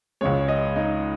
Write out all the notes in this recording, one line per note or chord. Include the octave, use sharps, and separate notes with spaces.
C#2 C#3 G#3 C#5
D#5
D#4